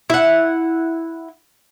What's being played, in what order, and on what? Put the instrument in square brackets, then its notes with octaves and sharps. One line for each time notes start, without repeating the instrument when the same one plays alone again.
[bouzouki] E4 F#5